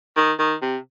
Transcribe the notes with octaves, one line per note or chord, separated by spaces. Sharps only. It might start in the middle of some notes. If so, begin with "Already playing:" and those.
D#3
D#3
C3